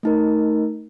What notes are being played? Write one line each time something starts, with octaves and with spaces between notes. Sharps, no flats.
A3 D#4 A#4